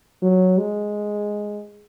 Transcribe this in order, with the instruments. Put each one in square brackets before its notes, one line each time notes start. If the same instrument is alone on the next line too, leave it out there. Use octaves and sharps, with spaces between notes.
[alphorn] F#3
G#3